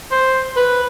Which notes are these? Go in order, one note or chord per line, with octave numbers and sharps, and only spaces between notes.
C5
B4